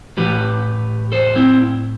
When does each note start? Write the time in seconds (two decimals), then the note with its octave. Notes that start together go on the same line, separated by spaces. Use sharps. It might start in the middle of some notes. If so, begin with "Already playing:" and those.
0.17 A2 E3 G4 B4
1.12 A4 C5
1.36 C4 E4